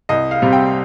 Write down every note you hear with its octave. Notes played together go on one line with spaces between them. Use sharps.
C2 D#5
F5
C3 G3 C4
G5